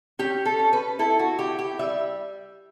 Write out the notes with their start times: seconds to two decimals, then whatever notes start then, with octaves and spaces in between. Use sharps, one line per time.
0.19 C#4 G4
0.45 A4
0.59 C#4
0.73 B4
0.99 E4 A4
1.19 F#4
1.39 E4 G4
1.59 G4
1.79 G3 E5